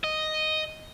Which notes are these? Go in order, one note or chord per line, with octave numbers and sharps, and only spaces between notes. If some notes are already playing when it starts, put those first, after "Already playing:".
D#5